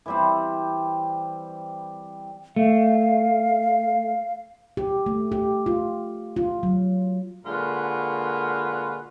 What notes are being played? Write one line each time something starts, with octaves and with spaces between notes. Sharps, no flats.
E3 G3 C4
A3 F5
G4
A3
G4
F4
F4
F#3
A#2 D3 G#3 F4 F#4 B4